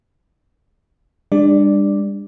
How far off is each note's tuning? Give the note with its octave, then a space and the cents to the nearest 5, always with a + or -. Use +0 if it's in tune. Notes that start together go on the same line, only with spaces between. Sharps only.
G3 +45 D4 +15 D5 +0